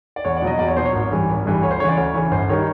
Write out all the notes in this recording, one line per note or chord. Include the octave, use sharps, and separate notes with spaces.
D5
E2 C#5
D5
B2 F#3 D#5
E2 D5
C#5
B2 F#3 C5
C#5
G#1
G2 E3 G3
G#1
G2 E3 G3
D2 C#5
C5
C#3 E3 C#5 D5
D2 C#5
C#3 E3
G1 C5
D#3 G3 C#5